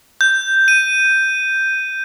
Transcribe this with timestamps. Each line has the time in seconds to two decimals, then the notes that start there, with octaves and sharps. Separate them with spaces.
0.21 G6
0.68 D#7